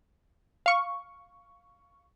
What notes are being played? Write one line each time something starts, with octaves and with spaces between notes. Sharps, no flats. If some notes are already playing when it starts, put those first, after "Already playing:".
F5 C#6